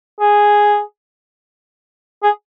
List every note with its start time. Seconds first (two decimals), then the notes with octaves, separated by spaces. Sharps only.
0.20 G#4
2.23 G#4